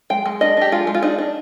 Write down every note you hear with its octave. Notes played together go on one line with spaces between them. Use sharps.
G#3 G5
G#3
D4 D#5
D4 G4
G#3 F4
G#3
F4
D4 D#4
D4